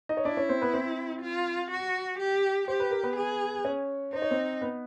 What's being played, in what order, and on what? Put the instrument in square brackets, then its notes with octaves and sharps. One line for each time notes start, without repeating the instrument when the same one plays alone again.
[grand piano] D#4 D#5
C#5
[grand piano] D4 D5 [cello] E4
[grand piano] C#4 C#5
C4 C5
B3 B4
C4 C5
[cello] F4
F#4
G4
[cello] G4 [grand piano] C5
[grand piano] B4
A#4
B3 B4
[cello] G#4
[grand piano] C#4 C#5
[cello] D#4 [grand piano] C5
[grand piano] C#5
C4 C5
B3 B4